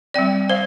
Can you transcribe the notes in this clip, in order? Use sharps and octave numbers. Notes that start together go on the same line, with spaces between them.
G3 C4 D5 G5
C5 F5